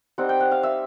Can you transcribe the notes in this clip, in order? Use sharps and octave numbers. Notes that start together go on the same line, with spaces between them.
G3 C4 D#4 F#5
G5
F#5
F5
E5